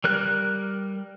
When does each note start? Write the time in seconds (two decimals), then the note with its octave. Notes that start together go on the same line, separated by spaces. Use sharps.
0.04 G3 A#4 F#6